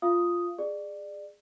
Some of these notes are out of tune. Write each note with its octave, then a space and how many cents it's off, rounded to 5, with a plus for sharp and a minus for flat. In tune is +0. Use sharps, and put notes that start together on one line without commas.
F4 +0 F5 -20 D#6 +0
G#4 -10 D5 +20